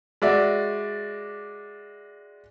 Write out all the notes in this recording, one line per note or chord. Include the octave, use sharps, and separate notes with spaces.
G#3 F#4 D5 E5